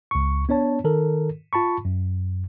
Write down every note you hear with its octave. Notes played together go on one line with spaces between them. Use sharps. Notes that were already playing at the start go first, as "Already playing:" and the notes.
C#2 C#6
B3 D4 C#5 A5
D#3 A4 A#4
F4 A5 B5 C#6
F#2